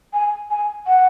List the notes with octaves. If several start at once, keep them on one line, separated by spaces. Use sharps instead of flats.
G#5
G#5
F#5